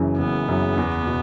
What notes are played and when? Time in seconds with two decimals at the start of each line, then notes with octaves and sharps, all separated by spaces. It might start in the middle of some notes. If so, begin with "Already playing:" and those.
Already playing: F#1 F#2 C#3 E3
0.19 F#1 B3
0.48 F#2 C#3 E3
0.77 E2
1.07 B2